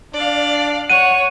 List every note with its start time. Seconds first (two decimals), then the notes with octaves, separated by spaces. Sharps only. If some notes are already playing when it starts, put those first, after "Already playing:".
0.14 D4 D5 F5
0.90 C#5 F#5 D#7